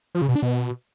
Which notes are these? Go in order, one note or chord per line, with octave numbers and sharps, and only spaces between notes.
F3
C#3
B2
D4
B2